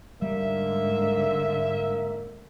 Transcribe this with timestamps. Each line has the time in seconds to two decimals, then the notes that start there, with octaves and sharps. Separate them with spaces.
0.22 G#2 D3 G3 A#3 E5